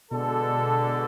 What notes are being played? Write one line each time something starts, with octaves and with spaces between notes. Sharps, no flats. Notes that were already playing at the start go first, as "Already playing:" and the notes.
B2 D3 G#3 D4 A4